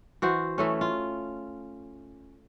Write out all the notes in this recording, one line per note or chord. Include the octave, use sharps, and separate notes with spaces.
E3 F#4 C5
E3 A3 C#4
F4